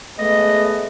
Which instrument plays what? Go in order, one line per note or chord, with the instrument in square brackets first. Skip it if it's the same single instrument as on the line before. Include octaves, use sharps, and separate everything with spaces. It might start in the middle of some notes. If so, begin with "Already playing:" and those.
[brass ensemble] G#3 A3 B3 [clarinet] D#5